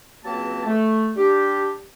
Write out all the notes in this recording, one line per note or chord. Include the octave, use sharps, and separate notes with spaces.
C#2 F#3 A#3 C4 B4 A5
A3
G3 D4 G4